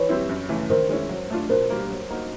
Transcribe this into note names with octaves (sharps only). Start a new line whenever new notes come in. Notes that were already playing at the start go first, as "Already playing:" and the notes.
Already playing: E3 B4 C#5
G3 C4 E4
F#2
C#3 E3 A3
D#3 A#4 C5
G#3 C#4 E4
F#3
A3 D4 F4
B2 A#4 C5
G3 A#3
F#3
A#3 D#4 F#4